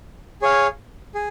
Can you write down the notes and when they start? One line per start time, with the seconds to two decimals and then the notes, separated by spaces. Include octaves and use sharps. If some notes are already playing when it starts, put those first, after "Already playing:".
0.42 G#4 C#5 F5
1.15 G#4